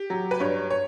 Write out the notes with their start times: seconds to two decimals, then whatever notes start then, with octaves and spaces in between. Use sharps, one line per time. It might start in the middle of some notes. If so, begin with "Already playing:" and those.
Already playing: G4
0.10 F#3
0.31 B4
0.40 G2 C#5
0.70 C#5